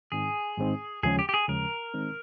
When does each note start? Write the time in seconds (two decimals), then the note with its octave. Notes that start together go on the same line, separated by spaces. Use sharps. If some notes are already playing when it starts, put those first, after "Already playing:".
0.12 G#2 D#3 G#3 C4 D#4 G#4
0.58 G#2 D#3 G#3 C4 D#4
1.03 D#2 C#3 F3 G#3 C#4 G#4
1.19 G4
1.29 G4
1.34 G#4
1.48 D#2 C#3 F3 G#3 C#4 A#4
1.94 D#3 G#3 C4 D#4